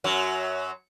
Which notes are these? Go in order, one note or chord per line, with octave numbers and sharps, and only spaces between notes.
F#2 F#3